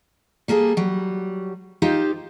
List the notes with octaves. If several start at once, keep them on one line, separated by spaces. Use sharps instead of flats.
G3 A#3 G#4 A4
F#3 G3
D#4 F4 G4 C5 F5